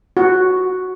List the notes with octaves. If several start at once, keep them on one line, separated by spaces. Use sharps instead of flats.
F#4